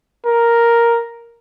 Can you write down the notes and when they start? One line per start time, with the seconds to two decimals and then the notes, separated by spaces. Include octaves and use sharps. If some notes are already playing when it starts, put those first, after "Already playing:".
0.25 A#4